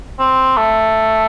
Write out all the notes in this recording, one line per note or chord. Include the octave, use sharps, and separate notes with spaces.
C4
A3